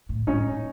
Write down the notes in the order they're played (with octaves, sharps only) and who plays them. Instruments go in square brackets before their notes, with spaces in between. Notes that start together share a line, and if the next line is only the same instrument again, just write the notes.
[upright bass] A2
[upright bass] G#2 [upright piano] C#4 D#4
[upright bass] A2
A#2